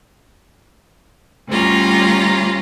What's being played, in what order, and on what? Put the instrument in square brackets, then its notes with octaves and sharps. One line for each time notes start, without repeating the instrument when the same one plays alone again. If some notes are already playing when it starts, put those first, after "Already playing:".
[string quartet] D2 G3 C#4 F4 A#5